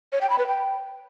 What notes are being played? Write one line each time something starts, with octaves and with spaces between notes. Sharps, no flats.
C#5
G5
B5
B4
G5